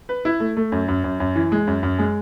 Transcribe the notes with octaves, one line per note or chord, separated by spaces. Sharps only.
B4
E4
A3
A3
F#2
F#2
F#2
F#2
E3
G#3
F#2
F#2
G#3